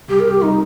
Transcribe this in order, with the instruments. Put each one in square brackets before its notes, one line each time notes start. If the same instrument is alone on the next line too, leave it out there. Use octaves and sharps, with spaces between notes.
[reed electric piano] C2 C3 G3 [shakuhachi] G4
[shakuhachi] A#4
G4
[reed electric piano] C3 G3 [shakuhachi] D#4